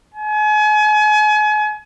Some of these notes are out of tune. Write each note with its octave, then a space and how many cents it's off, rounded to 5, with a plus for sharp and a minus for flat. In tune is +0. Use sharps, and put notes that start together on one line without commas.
G#5 +35